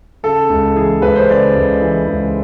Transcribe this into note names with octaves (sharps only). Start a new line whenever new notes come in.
C#3 A4
C#2
E3 G#4
C#2 B4
C5
C#3 D5
C#2
E3
C#2